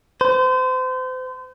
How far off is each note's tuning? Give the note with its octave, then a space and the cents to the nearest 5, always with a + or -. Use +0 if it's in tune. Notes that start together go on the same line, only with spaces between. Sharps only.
C5 -35